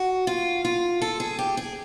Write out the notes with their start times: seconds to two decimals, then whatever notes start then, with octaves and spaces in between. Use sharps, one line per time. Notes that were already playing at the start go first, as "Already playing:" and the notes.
Already playing: F#4
0.27 F4
0.65 F4
1.02 A4
1.20 G#4
1.39 G4
1.57 G#4